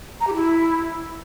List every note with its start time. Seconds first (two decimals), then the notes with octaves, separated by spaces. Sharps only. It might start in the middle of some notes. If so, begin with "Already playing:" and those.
0.20 A#5
0.27 G4
0.34 E4